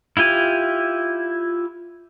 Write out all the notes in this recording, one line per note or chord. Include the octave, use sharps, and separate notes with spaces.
E4 F4 G4 G#5